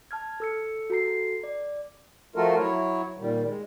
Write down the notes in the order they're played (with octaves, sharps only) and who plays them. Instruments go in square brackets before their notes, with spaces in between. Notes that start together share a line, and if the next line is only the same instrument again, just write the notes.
[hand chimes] A5 F6 G#6
A4 E6 C#7
F#4 A4 A#5 C7
D5
[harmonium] F3 A3 F4 F#4 A4 A#4
F#3 E4 C#5
A#2 D#3 G3
G#3